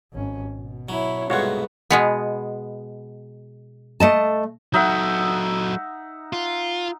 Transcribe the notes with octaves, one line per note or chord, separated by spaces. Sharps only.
G#1 C#4
B2
F#3 E4 C#5
C2 G#2 A3 B3 F4 F#4 C#5
B2 G#3 B3
A3 D#5 A5
F#3 D#4 A4 E5 F#5
F4